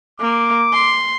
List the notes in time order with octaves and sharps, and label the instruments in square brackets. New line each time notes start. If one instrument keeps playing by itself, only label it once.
[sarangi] A#3 [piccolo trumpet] D6
[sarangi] C6